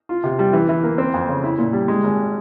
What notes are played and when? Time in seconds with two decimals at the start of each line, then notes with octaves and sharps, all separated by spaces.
0.09 F4
0.24 C3
0.39 G3
0.53 E3
0.69 E3
0.83 A#3
0.98 C4
1.14 F2
1.29 C#3
1.44 E4
1.58 A#2
1.73 G3
1.88 G#3
2.03 G#1